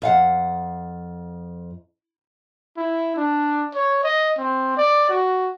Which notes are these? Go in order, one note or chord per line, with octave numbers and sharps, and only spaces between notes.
F2 F5 F#5
E4
D4
C#5
D#5
C4
D5
F#4